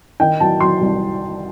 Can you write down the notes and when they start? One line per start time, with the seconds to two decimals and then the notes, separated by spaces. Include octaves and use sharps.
0.20 D#3 G5
0.40 F#3 A5
0.60 F#3 C6
0.81 C2